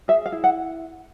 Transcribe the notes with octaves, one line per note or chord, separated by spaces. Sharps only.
G#4 E5
F5
E4
F#5